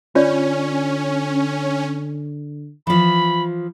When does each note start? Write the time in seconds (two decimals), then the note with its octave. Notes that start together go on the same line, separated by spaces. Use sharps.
0.15 D3 C#4 F4 C#5 D5
2.87 E3 F3 B5